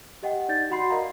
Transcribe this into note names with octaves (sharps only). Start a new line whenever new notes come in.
G4 D#5 F#5 G5
D#4 D5 G6 A6
F#4 F#5 B5 C6 C7
A#4 D5 D#5 F5 A#5